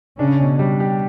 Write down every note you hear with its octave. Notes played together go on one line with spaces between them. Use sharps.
C#3 C#4 D4
B2
G3
G4